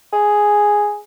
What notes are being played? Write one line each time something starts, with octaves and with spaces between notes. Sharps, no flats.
G#4